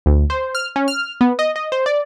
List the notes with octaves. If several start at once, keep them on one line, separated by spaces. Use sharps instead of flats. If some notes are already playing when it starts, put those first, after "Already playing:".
D2
C5
F6
C#4
F6
B3
D#5
D#5
C5
D5